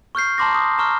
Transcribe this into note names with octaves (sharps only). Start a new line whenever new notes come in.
C#6 F6 G6 C7
A5 A#5 C6 D6 A#6
D#6
A#5 C#6 F6